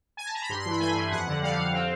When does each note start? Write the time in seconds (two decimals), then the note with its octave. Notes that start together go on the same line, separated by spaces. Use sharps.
0.17 G#5
0.26 A5
0.34 A#5
0.42 B5
0.49 G2 C6
0.60 C6
0.66 E3
0.71 B5
0.80 A3 G#5
0.96 G2
1.11 F2 F#5
1.27 D3
1.42 G3 F5
1.58 F2
1.74 C4